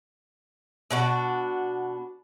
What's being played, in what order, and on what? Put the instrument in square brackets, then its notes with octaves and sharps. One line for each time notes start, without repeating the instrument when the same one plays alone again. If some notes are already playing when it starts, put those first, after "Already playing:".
[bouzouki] B2 D4 F#4